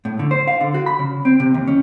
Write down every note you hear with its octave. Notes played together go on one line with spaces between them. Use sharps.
A2
D3
C5
F5
D3
F#4
B5
C#3
C4
C3
D#2
C#4